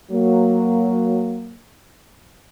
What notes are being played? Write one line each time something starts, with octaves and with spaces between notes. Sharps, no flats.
F#3 A#3